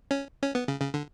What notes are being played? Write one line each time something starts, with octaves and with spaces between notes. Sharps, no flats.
C#4
C#4
B3
C#3
C#3
D3